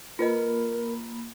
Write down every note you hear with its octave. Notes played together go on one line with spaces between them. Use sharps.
A#3 F4 A#4 B4 D#5 B5